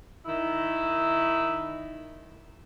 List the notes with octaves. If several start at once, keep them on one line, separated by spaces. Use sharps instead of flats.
D#3 E4